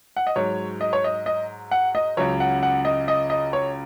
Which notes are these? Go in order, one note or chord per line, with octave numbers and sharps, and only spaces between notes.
F#5
D#5
G#2 F#3 C#5
D#5
C#5
D#5
D#5
F#5
D#5
C#2 C#3 F#3 C#5
F#5
F#5
D#5
D#5
D#5
C#5